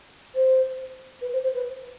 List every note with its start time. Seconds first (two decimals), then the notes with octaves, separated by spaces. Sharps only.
0.35 C5
1.22 B4
1.33 C5
1.44 C5
1.55 B4